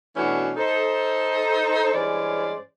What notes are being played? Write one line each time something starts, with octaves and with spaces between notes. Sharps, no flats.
B2 E3 A3 C#4 D4 F#4
D#4 A4 C5
G2 E3 G#3 C#4 C5 D5